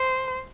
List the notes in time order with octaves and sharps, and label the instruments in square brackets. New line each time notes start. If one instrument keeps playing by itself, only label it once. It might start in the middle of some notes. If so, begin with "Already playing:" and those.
Already playing: [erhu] C5